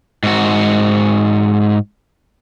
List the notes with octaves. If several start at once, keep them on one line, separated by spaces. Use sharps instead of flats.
G#2 F#4